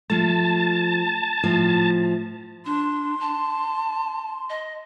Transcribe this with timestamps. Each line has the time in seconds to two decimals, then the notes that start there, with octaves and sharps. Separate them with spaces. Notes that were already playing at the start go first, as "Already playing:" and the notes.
0.10 F3 A3 A5
1.43 A2 F3
2.66 D4 C6
3.20 A5
4.50 D#5